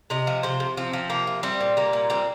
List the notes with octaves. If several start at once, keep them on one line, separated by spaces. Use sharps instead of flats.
C3 D#5
F3
C3 C5
C3
F3 C4
F3
C3 A#3
F3
G3 C4
A#2
G3 A#3
A#2
G3 C4